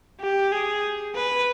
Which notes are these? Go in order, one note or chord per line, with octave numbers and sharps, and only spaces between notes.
G4
G#4
B4